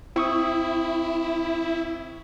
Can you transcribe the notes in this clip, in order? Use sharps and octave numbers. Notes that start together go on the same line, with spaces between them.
C4 E4 C#6 D#6